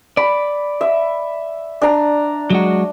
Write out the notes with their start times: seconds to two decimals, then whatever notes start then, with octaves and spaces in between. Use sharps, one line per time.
0.17 D5 B5
0.81 E5
1.82 D4 A#5
2.50 F#3 G#3 F#4